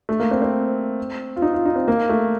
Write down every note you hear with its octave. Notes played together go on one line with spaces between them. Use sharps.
A3
A#3
C4
C4
F4
D#4
F4
D#4
C4
A#3
A3